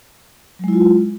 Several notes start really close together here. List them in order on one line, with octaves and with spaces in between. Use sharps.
F#3 G#3 E4 F4